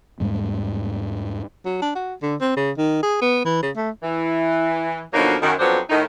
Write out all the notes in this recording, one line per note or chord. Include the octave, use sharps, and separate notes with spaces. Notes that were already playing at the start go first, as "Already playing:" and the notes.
E2 G#2 G3 G#3
F#3
D4
F#4
D3
C4
C#3
D#3
G#4
B3
E3
C#3
A3
E3
B2 D3 F3 F#3 A#3 D#4
F#2 D#3
F2 F#3 B3 D4 C5
A2 D#3 D#4